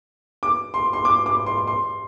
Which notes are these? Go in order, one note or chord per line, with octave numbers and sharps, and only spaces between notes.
D6
C6
C6
D6
D6
C6
C6